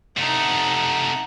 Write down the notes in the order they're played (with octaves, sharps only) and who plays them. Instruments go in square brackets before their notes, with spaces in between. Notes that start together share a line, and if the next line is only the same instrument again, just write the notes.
[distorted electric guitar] C3 A3 [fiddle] D#4 F#5